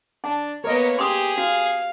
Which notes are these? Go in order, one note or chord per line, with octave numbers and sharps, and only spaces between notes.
D4 A5
A#3 B3 A#4 C#5 D#5
G4 G#4 C6 D#6
F#4 F5